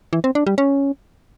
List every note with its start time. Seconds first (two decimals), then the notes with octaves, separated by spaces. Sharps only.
0.13 E3
0.24 C4
0.35 D4
0.47 G3
0.58 C#4